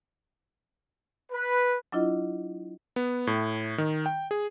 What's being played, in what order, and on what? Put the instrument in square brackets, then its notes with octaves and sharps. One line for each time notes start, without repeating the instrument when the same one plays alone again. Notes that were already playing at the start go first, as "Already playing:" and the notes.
[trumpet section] B4
[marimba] F#3 D4 E4 F4 D#5
[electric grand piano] B3
A2
D#3
G5
G#4